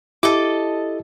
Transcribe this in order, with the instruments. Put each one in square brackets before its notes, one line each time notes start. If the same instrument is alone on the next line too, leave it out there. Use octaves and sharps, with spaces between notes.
[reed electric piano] E4 G4 [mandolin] A4 D#5 D6